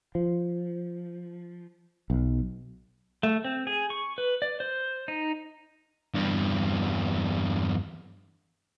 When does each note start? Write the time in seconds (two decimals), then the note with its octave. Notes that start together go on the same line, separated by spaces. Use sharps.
0.15 F3
2.10 B1
3.23 A3
3.45 C4
3.67 G#4
3.90 C#6
4.18 B4
4.42 D5
4.60 C5
5.08 D#4
6.14 E2 G2